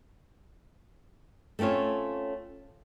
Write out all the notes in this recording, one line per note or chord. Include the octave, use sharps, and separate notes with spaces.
A3 C4 C#4 F4 C#5